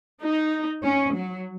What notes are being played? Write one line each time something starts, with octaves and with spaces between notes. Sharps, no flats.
D#4
C#4
F#3